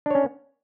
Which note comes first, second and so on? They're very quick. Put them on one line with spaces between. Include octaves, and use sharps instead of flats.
D4 C#5 C#4